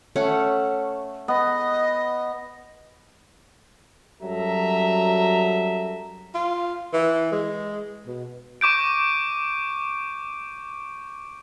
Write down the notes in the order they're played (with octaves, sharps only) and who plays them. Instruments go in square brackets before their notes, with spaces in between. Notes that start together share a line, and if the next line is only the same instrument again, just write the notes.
[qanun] A3 C#4 F#5
[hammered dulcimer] B3 [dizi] D#5
[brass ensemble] F#2 F#3 G3 A4 E5 A#5
[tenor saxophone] F4
E3
G#3
B2
[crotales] C#6 D6 G6 D7